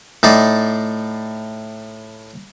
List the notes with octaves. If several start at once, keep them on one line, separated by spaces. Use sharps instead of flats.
A2 D#4 D5